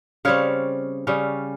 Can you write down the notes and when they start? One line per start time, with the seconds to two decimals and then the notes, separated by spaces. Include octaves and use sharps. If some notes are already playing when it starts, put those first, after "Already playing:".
0.25 C#3 G3 C4 C#5 F5
1.07 C#3 G3 C#4